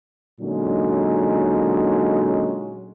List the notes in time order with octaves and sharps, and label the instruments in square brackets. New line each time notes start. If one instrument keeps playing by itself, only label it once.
[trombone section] A#2 D3 F#3 G#3 C#4 D#4